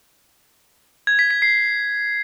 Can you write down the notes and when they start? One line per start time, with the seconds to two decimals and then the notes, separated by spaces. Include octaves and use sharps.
1.07 G#6
1.19 B6
1.31 B6
1.42 C7